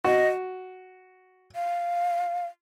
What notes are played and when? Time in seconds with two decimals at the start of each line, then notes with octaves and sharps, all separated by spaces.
0.04 F#4 D#5
1.55 F5